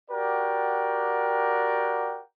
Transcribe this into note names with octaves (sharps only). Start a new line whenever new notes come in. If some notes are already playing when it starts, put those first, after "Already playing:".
F#4 G4 A#4 D5 F#5 G5